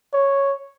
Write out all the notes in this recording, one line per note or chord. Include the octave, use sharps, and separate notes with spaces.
C#5